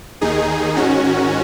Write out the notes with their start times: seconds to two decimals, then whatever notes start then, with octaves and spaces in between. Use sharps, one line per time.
0.21 D#2 D#3 D#4 G#4
0.76 G#2 D#3 C#4 F#4